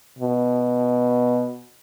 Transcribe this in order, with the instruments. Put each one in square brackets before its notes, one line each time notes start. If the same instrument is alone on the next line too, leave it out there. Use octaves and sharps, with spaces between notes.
[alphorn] B2